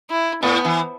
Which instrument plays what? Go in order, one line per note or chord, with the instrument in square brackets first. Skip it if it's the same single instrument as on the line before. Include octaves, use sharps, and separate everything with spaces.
[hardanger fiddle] E4
[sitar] A2 [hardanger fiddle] B3
[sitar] E3